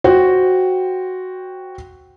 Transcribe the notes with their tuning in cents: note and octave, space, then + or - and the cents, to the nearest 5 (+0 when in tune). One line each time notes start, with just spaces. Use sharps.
F#4 +0 C5 +0 G5 +0